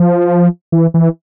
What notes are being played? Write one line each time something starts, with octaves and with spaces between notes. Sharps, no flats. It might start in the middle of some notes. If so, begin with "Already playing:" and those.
Already playing: F3
E3
E3